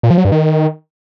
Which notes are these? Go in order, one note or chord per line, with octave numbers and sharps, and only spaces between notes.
A#2
F3
F#3
G2
D#3